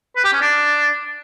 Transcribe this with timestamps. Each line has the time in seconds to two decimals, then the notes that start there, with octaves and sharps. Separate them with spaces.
0.17 B4
0.25 G4
0.33 C#4
0.41 D4